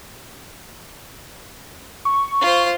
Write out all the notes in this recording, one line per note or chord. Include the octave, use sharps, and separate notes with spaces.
C#6
F4 C5